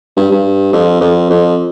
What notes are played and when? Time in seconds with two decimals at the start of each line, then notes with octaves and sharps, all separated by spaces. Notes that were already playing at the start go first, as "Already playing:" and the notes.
0.17 G2
0.31 G2
0.73 F2
1.01 F2
1.30 F2